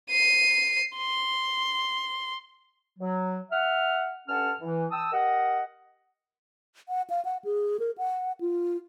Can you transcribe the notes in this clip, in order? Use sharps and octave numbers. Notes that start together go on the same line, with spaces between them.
C7 D#7
C6
F#3
E5 F#5 F6
G2 C#4 A4 F#5 A5 F6
E3
G5 A5 D#6 E6
G4 A#4 D#5 F#5
F#5
F5
F#5
G#4
A#4
F#5
F4